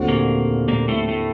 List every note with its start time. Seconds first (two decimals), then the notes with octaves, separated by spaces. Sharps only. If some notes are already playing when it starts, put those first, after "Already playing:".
Already playing: D#2 D3 A3 C4 F#4
0.08 A#2 A#3
0.68 A#2 A#3
0.88 A2 A3
1.08 A2 A3